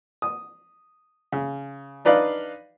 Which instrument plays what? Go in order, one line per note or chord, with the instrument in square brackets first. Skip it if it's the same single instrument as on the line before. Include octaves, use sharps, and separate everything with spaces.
[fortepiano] D#6
C#3
D4 D#4 B4 D5 F5